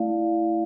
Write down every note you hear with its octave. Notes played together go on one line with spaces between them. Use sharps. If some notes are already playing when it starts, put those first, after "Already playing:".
Already playing: A3 E4 D5 F5